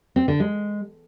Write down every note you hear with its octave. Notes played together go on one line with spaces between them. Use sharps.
C4
D3
G#3